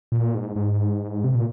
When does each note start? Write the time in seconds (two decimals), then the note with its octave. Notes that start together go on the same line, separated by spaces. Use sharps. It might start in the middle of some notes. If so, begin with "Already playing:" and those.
0.12 A#2
0.35 G#2
0.56 G#2
1.24 C3
1.35 A#2